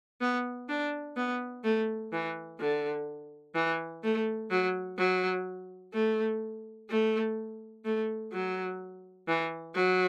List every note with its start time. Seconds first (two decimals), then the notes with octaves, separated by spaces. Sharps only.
0.21 B3
0.68 D4
1.16 B3
1.64 A3
2.12 E3
2.59 D3
3.55 E3
4.03 A3
4.51 F#3
4.98 F#3
5.94 A3
6.90 A3
7.85 A3
8.33 F#3
9.28 E3
9.75 F#3